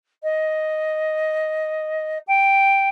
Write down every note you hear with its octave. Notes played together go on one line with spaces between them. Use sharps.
D#5
G5